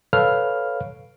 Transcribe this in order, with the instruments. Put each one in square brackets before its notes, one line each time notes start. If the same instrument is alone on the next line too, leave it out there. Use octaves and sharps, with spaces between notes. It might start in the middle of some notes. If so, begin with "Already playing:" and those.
[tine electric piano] A4 B4 C#5 F5 F6